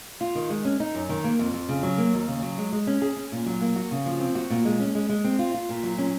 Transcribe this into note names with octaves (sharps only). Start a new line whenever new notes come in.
F4
D#3
G#3
C#4
D#4
F#2
D#3
A#3
F2
F2
C#3
F#3
A#3
D#2
C#3
F#3
G#3
G#3
C#4
G#4
C#4
A#2
F#3
A#3
F#4
C#3
F3
C4
F#4
A#2
G#3
C#4
G#3
G#3
C4
F4
F4
A#2
F#3
C#4